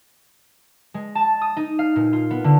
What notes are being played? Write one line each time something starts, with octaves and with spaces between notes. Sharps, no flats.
G#3
A5
D#6
D#4
F5
A#2
F4
B3
D3